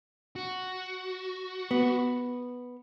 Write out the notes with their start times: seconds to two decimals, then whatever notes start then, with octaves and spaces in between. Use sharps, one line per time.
0.36 F#4
1.71 B3